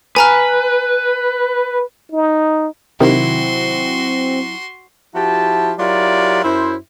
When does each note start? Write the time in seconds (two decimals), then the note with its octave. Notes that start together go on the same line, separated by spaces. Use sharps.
0.16 B4 G#5 A#5 F6
2.12 D#4
3.00 C3 D#3 F#3 C4 E4 F#4 C6
5.14 F3 E4 F#4 G4 A5
5.79 F#3 E4 F4 G4 A#4 D5
6.43 F#2 E4 C5